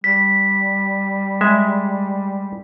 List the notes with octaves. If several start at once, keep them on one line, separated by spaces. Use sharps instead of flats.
G3 B6
G#3 E5